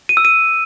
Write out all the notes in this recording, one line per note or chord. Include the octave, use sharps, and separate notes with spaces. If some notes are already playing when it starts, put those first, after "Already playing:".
D#7
E6
D#7